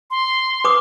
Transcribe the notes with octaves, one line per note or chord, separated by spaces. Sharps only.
C6
B4 D6 D#6